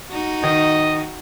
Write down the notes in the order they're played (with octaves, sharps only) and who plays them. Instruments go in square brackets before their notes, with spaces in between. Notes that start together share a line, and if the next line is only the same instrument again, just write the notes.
[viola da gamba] D#4 F#4
[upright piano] D#3 [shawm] D#5